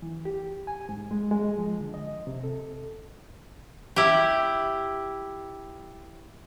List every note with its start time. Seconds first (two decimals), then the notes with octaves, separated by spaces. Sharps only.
0.02 E3
0.25 G4
0.67 G#5
0.89 G#2
1.11 G#3
1.31 G#3
1.58 F3
1.80 D3
1.94 D#5
2.27 C3
2.43 A4
3.96 E4 G4